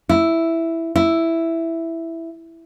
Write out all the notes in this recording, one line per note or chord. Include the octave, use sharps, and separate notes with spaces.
E4
E4